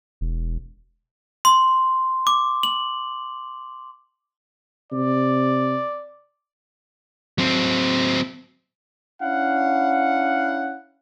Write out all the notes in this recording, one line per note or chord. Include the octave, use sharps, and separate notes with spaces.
E1
C6
D6
F#7
C3 D5
F#3 C4
C#4 D4 E4 F5 F#5